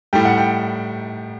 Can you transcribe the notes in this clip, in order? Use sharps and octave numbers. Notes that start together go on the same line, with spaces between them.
A2 G3 G5
F#5
G5